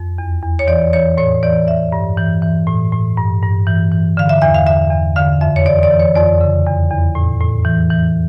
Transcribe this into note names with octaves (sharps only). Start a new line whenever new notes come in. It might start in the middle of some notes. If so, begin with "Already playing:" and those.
Already playing: F2
E2
E2
C#5
E3 D5
E3 C#5
A2 C#5
E3 D5
E3 E5
G2
E3
E3
A2
A2
G2
G2
E3
E3
D3 F5
E5
E2 E5
F5
D3 E5
E2
D3 F5
F2 E5
C#5
E3 D5
D5
E3
C#5
F2 D5
C#3
E2
E2
A2
A2
E3
E3